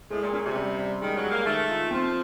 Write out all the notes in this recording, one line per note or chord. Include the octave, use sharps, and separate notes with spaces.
A2 G#3
A#2
A#2 C#4
C3
G3
G3
D#3 G#3
F#3
G#3
A#3
D#3 A3
F4
F3 C4